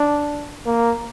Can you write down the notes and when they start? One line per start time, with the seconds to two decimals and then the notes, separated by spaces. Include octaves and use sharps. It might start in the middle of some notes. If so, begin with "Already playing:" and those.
Already playing: D4
0.66 A#3